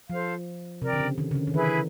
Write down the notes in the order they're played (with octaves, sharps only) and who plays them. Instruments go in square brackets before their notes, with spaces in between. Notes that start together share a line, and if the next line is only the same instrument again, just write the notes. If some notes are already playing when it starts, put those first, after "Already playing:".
[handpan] F3 [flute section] A4 C5 F5
[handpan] C3 [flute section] A#4 D5 G5
[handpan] D3
C#3
D#3
C#3
D3
D#3
[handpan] E3 [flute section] E4 G#4 B4 E5